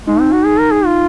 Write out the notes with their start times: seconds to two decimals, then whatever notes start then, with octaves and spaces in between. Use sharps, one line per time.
0.07 G#3 D#4
0.20 C4
0.33 F#4
0.45 G#4
0.60 A#4
0.72 G#4
0.86 F4